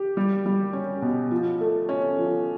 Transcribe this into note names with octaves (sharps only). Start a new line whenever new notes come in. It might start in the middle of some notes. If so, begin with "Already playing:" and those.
Already playing: G4
G3
G3
C#4
B2
F3
A3
C#4
F3